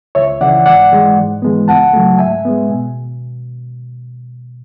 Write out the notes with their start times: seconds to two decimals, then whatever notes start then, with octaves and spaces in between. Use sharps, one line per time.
0.15 C#2 C#5 E5
0.41 C#3 E3 D5 F#5
0.66 G#2 D5 F#5
0.92 E3 G#3
1.17 G#2
1.42 E3 G#3 B3
1.68 C#2 F#5 A5
1.93 C#3 F#3 A3
2.18 G#2 E5 G#5
2.45 G#3 B3
2.69 B2